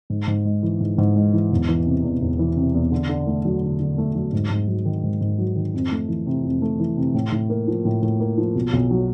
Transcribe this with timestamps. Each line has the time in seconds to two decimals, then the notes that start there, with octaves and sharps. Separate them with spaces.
0.10 G#2
0.28 G#2
0.45 G#3
0.63 E3
0.80 G#2
0.98 G#2
1.16 G#3
1.33 E3
1.52 E1
1.69 E3
1.86 C3
2.04 E2
2.21 E1
2.39 E3
2.57 C3
2.75 E2
2.92 D3
3.09 D3
3.27 A3
3.45 F#3
3.62 D3
3.80 D3
3.98 A3
4.15 F#3
4.33 G#2
4.50 G#2
4.68 F#3
4.85 D#3
5.04 G#2
5.21 G#2
5.38 F#3
5.56 D#3
5.74 F2
5.91 A3
6.09 E3
6.26 C3
6.44 F2
6.62 A3
6.80 E3
6.97 C3
7.14 A2
7.32 A2
7.50 A#3
7.68 F3
7.85 A2
8.02 A2
8.20 A#3
8.38 F3
8.56 B1
8.73 B1
8.91 F#3